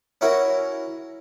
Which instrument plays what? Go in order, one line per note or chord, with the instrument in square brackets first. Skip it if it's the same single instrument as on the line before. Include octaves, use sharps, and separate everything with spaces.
[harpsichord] C#4 E4 F#4 A#4